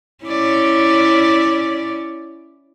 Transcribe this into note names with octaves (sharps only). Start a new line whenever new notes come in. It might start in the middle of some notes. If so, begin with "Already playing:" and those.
C#4 E4 D5